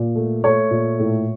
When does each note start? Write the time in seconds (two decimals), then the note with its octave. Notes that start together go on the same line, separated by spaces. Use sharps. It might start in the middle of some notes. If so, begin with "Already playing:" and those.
Already playing: A#2
0.16 A3
0.44 A3 C#5
0.71 A#2
0.99 A2